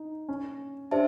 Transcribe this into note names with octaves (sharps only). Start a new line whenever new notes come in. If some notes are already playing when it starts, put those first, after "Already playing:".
Already playing: D#4
C#4
D4 G4 C5 E5 A5